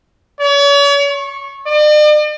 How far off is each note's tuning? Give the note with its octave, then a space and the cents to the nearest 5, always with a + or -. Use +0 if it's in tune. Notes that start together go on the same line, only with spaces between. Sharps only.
C#5 +40
C#6 -20
D5 +45